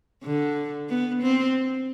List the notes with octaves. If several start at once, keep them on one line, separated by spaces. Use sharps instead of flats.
D3
B3
C4